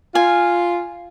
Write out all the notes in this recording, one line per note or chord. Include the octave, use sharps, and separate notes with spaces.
F4 G#5